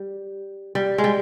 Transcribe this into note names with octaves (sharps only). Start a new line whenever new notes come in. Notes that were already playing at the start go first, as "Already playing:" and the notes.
Already playing: G3
G3
G#3
G3